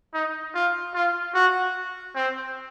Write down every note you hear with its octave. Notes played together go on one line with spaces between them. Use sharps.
D#4
F4
F4
F#4
C4